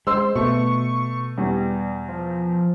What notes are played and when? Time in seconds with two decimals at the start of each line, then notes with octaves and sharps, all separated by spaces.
0.07 G#3 C5 C6 E6
0.35 B2 A3 C#6
1.38 E2 G3
2.08 F3